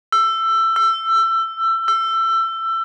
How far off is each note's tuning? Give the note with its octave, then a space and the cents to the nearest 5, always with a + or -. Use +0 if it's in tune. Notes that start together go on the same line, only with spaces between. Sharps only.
E6 +20
E6 +25
E6 +25